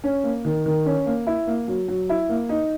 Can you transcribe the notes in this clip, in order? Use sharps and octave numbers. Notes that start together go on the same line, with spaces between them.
C#4
A#3
D#3
D#3
C#4
A#3
E4
A#3
F#3
F#3
E4
A#3
D#4